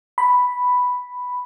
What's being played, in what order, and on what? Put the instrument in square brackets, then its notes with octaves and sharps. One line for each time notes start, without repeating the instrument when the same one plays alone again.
[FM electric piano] B5